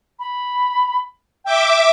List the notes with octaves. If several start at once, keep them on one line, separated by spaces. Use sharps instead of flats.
B5
E5 G5 D6